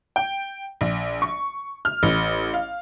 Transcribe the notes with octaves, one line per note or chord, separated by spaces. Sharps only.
G5
A#1
C#6
F6
A1
F5